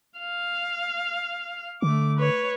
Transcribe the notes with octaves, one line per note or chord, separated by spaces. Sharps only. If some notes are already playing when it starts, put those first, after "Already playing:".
F5
D3 A3 D6
B4 C#5